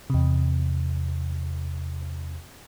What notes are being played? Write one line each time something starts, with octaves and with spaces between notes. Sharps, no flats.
E2 C3